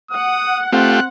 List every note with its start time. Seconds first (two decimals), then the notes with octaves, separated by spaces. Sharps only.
0.11 F#5 D#6
0.73 A3 C4 F4 G4 F#6